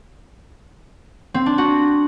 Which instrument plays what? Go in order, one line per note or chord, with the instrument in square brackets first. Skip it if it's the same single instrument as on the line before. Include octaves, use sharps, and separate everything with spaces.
[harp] C4
D4
F#4